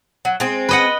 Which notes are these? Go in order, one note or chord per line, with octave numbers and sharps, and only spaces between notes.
F#3
G#3 C4
B4 D#5 F#5